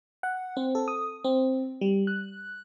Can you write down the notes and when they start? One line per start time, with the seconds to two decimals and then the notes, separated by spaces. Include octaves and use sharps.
0.23 F#5
0.57 C4
0.75 A4
0.88 D#6
1.24 C4
1.81 G3
2.07 F#6